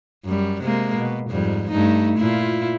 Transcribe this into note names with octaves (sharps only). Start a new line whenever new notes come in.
F#2 G3
C3 G#3 A#3
B2
F2 G#2 G3
G2 A3 D#4
A#2 E4 F4